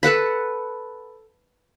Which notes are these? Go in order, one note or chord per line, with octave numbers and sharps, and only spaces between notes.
A4 B4 F#5 B5